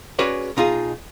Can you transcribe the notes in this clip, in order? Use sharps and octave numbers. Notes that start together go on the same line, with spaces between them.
C#4 F#4 G#4 B4 C#5 D5
B2 D#4 F4 G#4